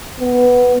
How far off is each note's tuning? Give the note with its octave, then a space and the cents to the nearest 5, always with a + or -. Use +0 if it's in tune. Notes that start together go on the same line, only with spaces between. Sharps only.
B3 +0